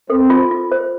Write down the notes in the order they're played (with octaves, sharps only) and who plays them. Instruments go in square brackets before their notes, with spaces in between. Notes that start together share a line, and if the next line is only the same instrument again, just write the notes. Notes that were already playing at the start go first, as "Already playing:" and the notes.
[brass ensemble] C4 [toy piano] A4
[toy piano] F4
F4
C5